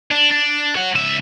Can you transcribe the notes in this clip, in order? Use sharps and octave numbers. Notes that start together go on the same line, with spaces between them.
D4
D4
C#5 F#5
C#2 E5